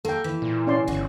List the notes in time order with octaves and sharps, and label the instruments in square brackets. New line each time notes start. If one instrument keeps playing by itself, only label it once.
[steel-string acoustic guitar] A#3 [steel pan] A4 G5
[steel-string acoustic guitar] E3
[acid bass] A#2
[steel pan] C#4 D5 C6
[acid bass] G1 [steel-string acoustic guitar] F#4 G#4